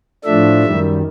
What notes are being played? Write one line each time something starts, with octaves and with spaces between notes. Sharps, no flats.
A2 F3 A3 D4 E5
F#2 D#3 G3